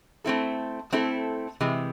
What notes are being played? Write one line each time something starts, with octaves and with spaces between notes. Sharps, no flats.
A3 C4 E4 A4
A3 C4 E4 A4
C3 E3 G#3